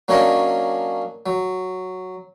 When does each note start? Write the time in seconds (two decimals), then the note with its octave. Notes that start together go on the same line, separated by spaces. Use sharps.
0.08 F#3 A#3 C#4 D4 C#5 D#5
1.26 F#3